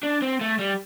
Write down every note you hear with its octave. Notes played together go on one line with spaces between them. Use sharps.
D4
C4
A3
G3